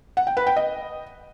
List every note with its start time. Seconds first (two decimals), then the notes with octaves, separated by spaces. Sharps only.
0.17 F#5
0.27 G5
0.37 B4
0.47 G5
0.56 D#5